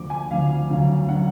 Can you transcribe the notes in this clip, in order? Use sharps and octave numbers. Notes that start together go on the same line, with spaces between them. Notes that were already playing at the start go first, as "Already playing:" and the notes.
Already playing: D2 D3 F3 D6
G#5
D2 D3 F3 F5
D2 D3 F#3
D3 F#3 F#5